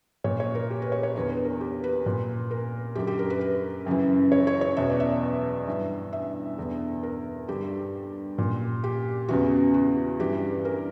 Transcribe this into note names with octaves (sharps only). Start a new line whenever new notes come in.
A#2 C#5
C#5
A#4
G4
B4
C#5
C#5
E2 D3 B4
B4
A#4
G4
B4
A#2
A#4
F#2 D3 G4
G4
A#4
B4
B4
F#2 C#3 E3
C#5
C#5
C#5
E2 B2 E5
D5
E5
G2 E3
E5
E2 D3
A#4
G2 D3 G4
A#2
G4
E2 C#3 E3 F#4
F#4
G2 E3 G4
A#4